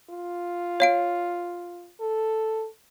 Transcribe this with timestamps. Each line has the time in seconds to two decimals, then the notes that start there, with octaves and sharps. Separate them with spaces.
0.10 F4
0.80 C#5 F5 D7
2.01 A4